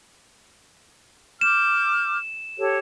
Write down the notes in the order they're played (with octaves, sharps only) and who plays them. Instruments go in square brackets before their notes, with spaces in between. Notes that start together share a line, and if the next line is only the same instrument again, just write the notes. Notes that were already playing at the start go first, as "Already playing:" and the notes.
[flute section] D6 F6 G6 [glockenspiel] E7
[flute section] G4 A4 C#5